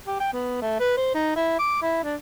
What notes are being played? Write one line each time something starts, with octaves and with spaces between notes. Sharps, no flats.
G4
G5
B3
A3
B4
C5
D#4
E4
D6
E4
D4